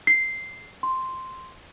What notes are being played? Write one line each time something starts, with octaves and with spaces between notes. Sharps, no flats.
C7
C6